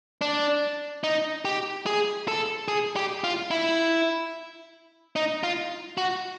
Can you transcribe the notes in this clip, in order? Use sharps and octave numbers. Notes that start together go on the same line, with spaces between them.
D4
D#4
G4
G#4
A4
G#4
G4
F4
E4
D#4
F4
F#4